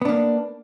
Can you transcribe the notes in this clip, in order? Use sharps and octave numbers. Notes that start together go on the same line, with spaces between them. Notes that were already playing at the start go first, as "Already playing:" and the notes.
A#3 B3 D4